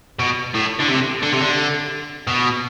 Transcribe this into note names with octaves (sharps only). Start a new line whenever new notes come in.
B2
A2
D3
C3
D3
C3
D3
B2